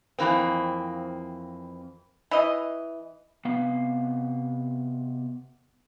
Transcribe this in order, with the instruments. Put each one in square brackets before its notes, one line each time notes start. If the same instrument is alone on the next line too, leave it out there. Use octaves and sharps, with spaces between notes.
[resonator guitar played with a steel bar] F2 G#2 E3 A#3 C4
[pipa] E3 D#5
[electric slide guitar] C3 B3 F5